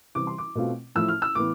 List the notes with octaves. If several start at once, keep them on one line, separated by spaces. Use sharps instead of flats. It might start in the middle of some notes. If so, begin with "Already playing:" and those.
C3 E3 G3 D6
C6
D6
B2 A3 C4 F4
A2 F3 A3 E4 E6
F6
E6
A2 E3 B3 D6